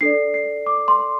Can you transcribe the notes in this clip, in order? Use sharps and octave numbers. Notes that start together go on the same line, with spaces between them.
D4 A4 D5 C7
C7
D6
C6